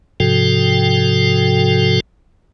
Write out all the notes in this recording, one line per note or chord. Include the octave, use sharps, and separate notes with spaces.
G#2 C3 F3 F#4 A4 G5